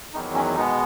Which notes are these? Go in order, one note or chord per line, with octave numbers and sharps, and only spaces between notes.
E2 D#3 F#3 D#4
C#4
B2 G#3 B3 D#4